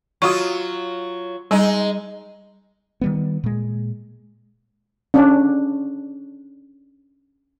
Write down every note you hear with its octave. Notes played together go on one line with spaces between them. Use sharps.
F#3 F4 F#4 C#6
G3 G#3 D#4
D#3 G3 B3
A#2 G#3
C#4 D4